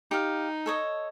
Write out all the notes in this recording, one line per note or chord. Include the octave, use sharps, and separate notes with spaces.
D#4 G4 F5
A4 C#5 D#5